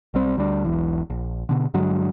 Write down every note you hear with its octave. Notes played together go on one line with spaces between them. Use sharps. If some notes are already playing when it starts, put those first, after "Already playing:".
B1 G3 C4
D2 G3 D4
E1 B1 E3
A#1
B2 D3
G2 D3 F#3 G#3